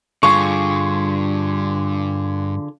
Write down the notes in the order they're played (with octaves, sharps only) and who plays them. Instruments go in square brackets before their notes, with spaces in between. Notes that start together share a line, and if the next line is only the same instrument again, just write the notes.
[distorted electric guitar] G2 [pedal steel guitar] D3 F4 G#4 [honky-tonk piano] C#6